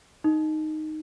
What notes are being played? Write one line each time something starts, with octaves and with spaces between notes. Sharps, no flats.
D#4